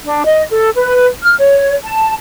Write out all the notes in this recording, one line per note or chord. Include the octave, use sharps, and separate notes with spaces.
D4
D#5
A4
B4
F6
C#5
A5